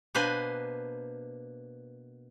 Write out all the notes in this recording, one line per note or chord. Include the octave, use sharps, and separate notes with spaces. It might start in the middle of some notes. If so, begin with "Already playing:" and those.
B2 A#3 D4 B4 C5 G#5